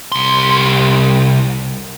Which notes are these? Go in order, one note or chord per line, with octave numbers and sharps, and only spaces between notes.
C2 C6